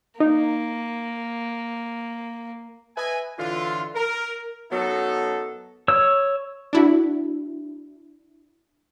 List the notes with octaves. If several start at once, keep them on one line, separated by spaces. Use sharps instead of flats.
A#3 D#4
B4 D#5 E5 G#5
A2 D3 E3 F4
A#4
F#2 F#3 B3 D#4 A4
C#5 E6
D4 E4 F#4